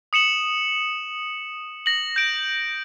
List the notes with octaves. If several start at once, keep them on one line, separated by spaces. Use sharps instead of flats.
D#6 C#7 E7 F#7
A#6 F#7
G6 D7